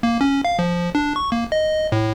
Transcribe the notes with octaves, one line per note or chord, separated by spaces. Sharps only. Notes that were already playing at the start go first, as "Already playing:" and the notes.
A#3
C#4
F5
F3
D4
C#6
A#3
D#5
A2